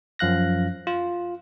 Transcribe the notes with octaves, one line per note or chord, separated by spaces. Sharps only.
F#2 F3 F5 F#6 A#6
F4